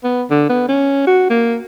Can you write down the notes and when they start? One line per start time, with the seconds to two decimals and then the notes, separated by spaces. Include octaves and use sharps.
0.04 B3
0.30 D3
0.49 B3
0.69 C#4
1.07 F#4
1.30 A#3